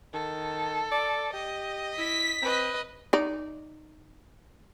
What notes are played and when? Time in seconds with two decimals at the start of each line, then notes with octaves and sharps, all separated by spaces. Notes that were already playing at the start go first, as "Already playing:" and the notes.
0.13 D#3 A4
0.91 D5
1.33 G4 D#5
1.98 E4 B6
2.42 C4 B4 D#5
3.13 D#4 D5